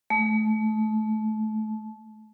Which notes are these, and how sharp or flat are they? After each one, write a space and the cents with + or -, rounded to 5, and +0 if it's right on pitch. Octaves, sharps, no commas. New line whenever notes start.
A3 -25